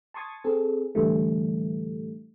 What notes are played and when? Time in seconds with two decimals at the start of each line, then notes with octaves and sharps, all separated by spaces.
0.14 A5 C6 C#6 D#6 G#6 A6
0.44 C4 G#4 A4
0.95 A2 D3 E3 G3 A3